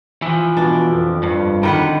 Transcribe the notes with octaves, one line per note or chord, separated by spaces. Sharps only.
E3 F3
B2 D4
F2
G2
D3 D#3 B4 F#5